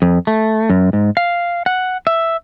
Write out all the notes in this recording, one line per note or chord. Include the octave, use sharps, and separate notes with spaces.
F2
A3
F#2
G#2
F5
F#5
E5